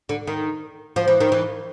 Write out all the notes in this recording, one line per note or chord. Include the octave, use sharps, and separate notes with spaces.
D3
D#3
F3
E3
D#3
E3